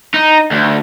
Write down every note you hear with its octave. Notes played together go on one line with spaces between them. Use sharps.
D#4
D2